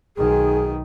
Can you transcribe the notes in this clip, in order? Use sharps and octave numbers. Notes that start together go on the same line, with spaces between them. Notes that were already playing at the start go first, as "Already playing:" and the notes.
B1 D#3 G#4